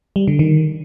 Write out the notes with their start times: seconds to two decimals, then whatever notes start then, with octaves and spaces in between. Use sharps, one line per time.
0.16 G3
0.27 D3
0.39 D#3